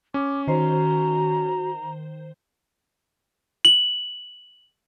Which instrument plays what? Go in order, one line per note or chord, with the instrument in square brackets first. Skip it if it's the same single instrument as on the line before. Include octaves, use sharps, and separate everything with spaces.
[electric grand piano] C#4 [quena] D6
[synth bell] D#3 C5 [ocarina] F#4 [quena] A#5
[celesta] F#7